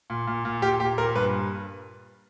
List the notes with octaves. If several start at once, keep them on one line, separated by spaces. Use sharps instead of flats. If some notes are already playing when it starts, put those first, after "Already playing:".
A#2
A#2
A#2
A#2 G4
A#2 G4
A#2 A#4
G2 B4